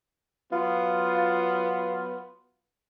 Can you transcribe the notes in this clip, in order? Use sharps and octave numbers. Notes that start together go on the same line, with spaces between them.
F#3 B3 F4